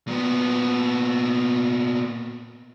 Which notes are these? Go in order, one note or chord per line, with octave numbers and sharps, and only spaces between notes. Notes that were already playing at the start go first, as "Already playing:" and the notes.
A#2 B3